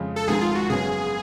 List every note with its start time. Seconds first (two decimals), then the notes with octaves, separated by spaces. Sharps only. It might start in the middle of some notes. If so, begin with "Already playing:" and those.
Already playing: F2 C#3 G#3
0.16 A4
0.28 G#1 G#2 F3 G#4
0.41 F4
0.55 F#4
0.69 F#1 F#2 C#3 F#3 B3 G#4